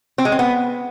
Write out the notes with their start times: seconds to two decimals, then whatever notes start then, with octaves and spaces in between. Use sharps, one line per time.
0.18 C4
0.25 G#3
0.32 C4
0.39 B3